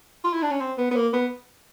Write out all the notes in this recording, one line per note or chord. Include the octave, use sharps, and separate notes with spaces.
F4
E4
D4
C#4
C4
B3
B3
A#3
B3